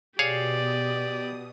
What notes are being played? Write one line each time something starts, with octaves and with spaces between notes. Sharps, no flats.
B2 G4 G#4 C#5 D5 F5 D#6